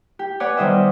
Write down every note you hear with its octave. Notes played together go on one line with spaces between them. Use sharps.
G4
B3 B4 C#5 D5 F#5 G#5
D#3 G3 C5 D#5 E5 E6